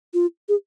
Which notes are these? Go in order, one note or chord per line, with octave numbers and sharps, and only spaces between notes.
F4
G#4